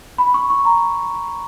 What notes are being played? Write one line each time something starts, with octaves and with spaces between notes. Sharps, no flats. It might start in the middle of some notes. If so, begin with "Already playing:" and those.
B5
C#6
C#6
A#5